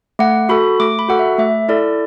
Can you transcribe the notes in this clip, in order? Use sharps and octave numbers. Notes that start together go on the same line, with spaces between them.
A3 F#5
F#4 A4 B5
A3 D6
B5
F#4 A4 F#5
E5
A3 E5
E4 A4 D5